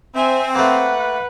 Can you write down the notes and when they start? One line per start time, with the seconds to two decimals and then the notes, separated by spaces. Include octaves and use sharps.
0.15 C4 E5 G#5
0.55 A3 A#3 B4 F#5